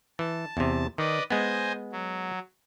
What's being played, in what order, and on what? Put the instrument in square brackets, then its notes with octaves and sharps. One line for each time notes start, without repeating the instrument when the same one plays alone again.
[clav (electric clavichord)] E3 [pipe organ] A5
[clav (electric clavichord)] E2 C3
[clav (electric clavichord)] D#3 [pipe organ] B4 D5 D#5
[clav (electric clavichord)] G#3 B3 [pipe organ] C5 D#5 G#5
[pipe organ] F#3